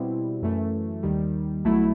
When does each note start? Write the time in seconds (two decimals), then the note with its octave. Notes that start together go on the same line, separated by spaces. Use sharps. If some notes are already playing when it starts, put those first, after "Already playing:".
Already playing: B2 G3 C4 E4
0.42 F#2 E3 A3
1.03 D#2 D#3 G3
1.64 B1 B2 F#3 A3 E4